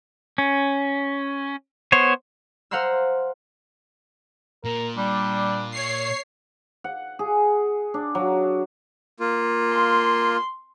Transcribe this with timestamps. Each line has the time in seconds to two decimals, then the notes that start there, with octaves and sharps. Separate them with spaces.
0.38 C#4
1.92 B3 C5 C#5
2.71 C5 F5 F#5 A#5 C6 E6
4.65 A#2 A#4
4.97 G3 D4
5.72 C#5 C7
6.84 F#5
7.19 G#4
7.94 D4
8.15 F#3
9.20 A#3 F4
9.71 C6